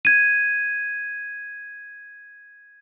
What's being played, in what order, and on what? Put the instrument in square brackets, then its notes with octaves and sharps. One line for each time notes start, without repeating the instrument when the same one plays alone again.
[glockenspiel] G#6 D#7